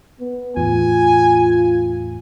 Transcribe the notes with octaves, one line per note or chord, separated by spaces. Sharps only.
B3
E2 A2 F4 G#5